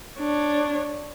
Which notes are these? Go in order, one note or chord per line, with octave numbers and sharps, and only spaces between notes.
D4 C#5